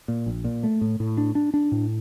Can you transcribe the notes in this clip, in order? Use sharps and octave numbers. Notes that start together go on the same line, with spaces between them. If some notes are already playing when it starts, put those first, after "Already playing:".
A#2
A#1
A#2
A3
A2
A2
D4
D4
D4
A2